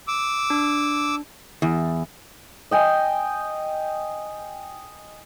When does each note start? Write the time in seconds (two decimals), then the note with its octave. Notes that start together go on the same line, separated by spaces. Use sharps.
0.08 D6 E6
0.50 D4
1.62 E2
2.71 D#5 G5 G#5